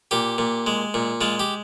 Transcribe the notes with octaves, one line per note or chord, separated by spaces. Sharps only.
A#2 G4
A#2
G#3
A#2
G#3 F4
G4